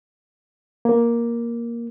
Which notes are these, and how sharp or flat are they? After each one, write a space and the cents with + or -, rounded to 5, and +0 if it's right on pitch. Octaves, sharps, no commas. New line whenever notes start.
A#3 +10